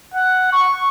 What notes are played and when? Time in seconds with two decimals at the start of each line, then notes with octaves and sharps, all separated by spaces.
0.14 F#5
0.52 C#6